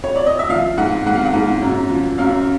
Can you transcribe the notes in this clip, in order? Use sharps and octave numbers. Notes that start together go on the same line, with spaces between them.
C#5
D5
D#5
E5
F3 F5
G#2 F#5
G#2 F#5
F5
F#5
G#2
F#2
F3
F#2 F5